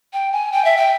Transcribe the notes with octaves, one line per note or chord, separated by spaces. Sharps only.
G5
G#5
G5
E5
G5